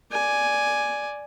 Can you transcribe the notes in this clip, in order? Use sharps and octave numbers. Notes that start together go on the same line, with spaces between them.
D5 G#5